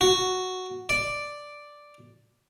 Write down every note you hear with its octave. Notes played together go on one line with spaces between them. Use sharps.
F#4
D5